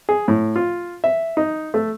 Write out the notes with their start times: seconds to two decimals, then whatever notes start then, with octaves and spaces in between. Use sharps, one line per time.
0.09 G#4
0.28 A2
0.56 F4
1.04 E5
1.37 D#4
1.74 A3